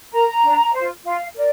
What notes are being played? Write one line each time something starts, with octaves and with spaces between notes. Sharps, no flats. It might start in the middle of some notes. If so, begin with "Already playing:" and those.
A#4 A#5
D4
F4 C5
F4 F5
A#4 D5